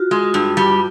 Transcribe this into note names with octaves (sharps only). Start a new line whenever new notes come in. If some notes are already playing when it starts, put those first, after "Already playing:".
Already playing: F4 F#4
G#3
G2
G3